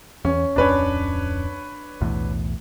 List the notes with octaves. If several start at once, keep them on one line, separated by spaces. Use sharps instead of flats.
E2 C#4
D1 F2 C#4 D4 B4 C#5
B1 E2 A2